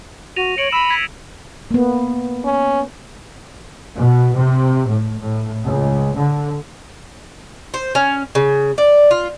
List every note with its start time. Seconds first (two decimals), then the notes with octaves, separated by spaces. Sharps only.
0.36 F#4 A#6 D#7 F7
0.58 C#5 C#7 D7 F#7
0.72 B5 E6 E7
0.90 G#6 B6
1.71 A#3 B3
2.45 C#4
3.96 B2
4.32 C3
4.86 A2
5.19 A2
5.64 C#2
6.16 D3
7.74 C5
7.95 C#4
8.35 C#3
8.78 D5
9.11 F4